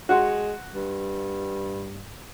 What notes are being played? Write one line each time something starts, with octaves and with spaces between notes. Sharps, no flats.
G#3 F#4 F#5 C6
G2